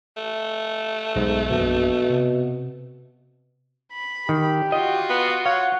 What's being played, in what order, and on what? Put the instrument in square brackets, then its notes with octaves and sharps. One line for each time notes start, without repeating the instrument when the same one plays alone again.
[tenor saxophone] A3
[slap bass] B1 [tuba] G#2
[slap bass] A#1 F#2 [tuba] B2
[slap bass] C3
[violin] B5
[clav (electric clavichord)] D#3 [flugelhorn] G4
[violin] F4 F#4 [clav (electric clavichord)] D#5
[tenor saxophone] B3
[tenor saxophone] C#5 [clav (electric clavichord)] F5 [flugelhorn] F#5